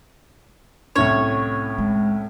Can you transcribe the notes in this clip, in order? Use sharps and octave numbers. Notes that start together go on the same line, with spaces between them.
C2 A2 C#4 C#5
G#3